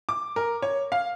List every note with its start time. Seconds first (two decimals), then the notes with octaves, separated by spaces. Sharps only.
0.09 D6
0.36 A#4
0.62 C#5
0.92 F5